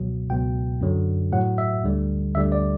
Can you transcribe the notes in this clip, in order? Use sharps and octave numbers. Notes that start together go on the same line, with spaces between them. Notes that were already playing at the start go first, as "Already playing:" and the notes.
Already playing: C#2 B2 F#3
C#2 B2 F#3 G5
F#2 D3 F#3
A2 F#3 F#5
E5
D2 D3 G3
D2 D3 G3 E5
D5